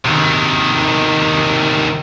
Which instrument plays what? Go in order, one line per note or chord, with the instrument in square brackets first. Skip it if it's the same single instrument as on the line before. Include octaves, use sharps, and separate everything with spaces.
[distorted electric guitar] C3 D#3